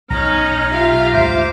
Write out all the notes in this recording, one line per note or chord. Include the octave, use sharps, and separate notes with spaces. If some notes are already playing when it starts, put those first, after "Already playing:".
B1 C#4 D#4 A#5 F6
F4 G4 E5 F5
D2 G#2 C5 D6